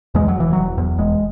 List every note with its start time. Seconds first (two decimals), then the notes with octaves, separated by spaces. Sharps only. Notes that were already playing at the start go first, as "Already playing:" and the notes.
0.15 E2 G#3
0.28 F#3
0.36 E1 E3
0.53 E1 F#3
0.78 E2
0.98 E1 G#3